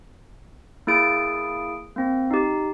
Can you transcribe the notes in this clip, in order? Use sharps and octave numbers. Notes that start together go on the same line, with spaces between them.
A#3 E4 G#4 D7
A#3 C4
D#4 G4